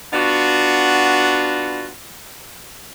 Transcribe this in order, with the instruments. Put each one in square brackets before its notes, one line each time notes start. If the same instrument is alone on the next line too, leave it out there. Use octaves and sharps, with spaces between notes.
[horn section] B3 D4 F4 F#4